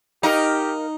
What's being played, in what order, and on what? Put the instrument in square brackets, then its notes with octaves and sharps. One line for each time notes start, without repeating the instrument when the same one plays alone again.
[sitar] D#4 [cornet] G4 [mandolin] A#4 D#5 F5